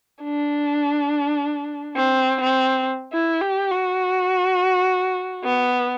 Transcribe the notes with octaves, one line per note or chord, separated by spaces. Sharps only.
D4
C4
C4
E4
G4
F#4
B3